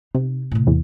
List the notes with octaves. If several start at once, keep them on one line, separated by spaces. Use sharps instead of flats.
C3 D#4
A2 C3
E2